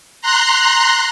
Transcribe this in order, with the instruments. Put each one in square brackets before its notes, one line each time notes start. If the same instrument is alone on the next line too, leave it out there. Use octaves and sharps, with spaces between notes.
[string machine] A#5 C6 F#6